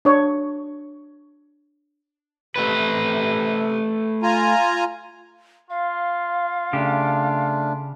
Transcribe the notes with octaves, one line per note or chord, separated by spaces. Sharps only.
D4 C#5
C3 A3 B4
F4 G#5 A#5
F4 F5
C#3 A3 D4 G4